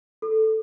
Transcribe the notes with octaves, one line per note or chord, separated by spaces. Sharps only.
A4